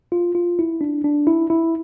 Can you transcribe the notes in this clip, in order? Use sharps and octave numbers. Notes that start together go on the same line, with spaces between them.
F4
F4
E4
D4
D4
E4
E4